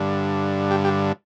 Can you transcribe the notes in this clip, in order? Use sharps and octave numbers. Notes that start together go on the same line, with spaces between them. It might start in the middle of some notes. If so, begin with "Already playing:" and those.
Already playing: G2 D3
G4
G4